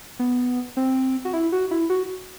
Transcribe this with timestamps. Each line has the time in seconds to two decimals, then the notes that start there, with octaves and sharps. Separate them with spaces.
0.19 B3
0.77 C4
1.25 F#4
1.33 E4
1.52 F#4
1.71 E4
1.90 F#4